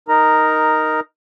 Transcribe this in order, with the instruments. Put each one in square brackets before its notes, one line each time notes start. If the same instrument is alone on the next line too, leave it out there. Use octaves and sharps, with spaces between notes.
[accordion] D#4 A#4 A#5